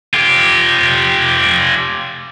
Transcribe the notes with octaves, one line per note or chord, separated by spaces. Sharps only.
F4 G4